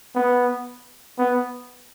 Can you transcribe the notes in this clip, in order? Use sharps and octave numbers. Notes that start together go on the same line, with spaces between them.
B3
B3